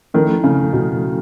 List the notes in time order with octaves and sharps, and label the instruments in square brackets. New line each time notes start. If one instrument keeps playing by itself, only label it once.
[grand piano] D#3 [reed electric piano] F3 A3 C#4 E4 A4
[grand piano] C#3
B2